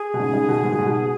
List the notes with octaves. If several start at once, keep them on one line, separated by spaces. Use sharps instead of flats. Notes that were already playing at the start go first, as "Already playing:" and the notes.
Already playing: G#4
B2
G#2 C#3
G#2 C#3
B2 D#3
G#2
B2
G#2
B2